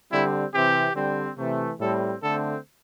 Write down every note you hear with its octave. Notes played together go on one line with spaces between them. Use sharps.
D3 G3 C4 E4
C3 E3 C4 G4
D3 G3 C4
C3 E3 A3
A2 G3 C4 A4
D3 A3 C4 A4